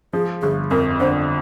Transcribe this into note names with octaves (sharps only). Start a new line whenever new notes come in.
F3 G#4
G1 G#4
F2 A#4
D3 C5